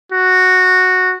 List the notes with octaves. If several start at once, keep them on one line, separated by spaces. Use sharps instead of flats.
F#4